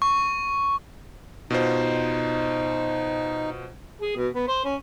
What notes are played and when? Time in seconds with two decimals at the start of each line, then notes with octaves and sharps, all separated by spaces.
0.02 C#6
1.50 B2 D#4 F4 C5
4.02 G#4
4.17 B2
4.35 B3
4.48 C5
4.65 C#4